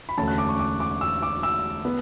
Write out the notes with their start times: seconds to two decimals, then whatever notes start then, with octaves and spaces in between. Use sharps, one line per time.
0.09 B5
0.18 E1 D2 D3 A3 C#4 A5
0.28 F#6
0.38 D6
0.49 C#6
0.59 D6
0.80 D6
1.01 E6
1.22 D6
1.43 E6
1.85 B3